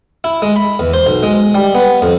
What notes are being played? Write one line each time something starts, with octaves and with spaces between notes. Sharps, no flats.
E4
G#3
B5
E2
C5
B1
G#3
G3
B3
F2